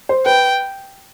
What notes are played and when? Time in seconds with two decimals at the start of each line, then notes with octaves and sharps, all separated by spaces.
0.09 C5
0.26 B4 G5